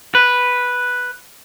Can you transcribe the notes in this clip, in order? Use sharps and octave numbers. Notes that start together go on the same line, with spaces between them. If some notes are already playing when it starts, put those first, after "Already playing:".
B4